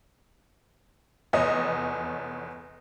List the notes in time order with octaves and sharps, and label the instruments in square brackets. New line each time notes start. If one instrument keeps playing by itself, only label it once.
[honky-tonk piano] F1 E2 C#5 D#5